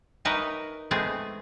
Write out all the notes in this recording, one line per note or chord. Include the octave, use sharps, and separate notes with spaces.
D#4 A#4 B4 C#5 D#5 E5
G#3 A3 B3 C4 G#4